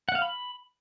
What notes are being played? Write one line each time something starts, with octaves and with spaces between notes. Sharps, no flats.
F#5
F5
B5